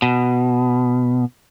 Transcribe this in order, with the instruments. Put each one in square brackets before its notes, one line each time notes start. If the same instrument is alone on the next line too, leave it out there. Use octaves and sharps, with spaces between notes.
[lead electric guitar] B2